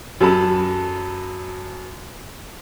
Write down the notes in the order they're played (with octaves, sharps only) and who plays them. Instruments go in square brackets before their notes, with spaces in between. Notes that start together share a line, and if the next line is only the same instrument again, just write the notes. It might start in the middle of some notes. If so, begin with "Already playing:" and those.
[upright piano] F#2 F#3 A4 A5 B5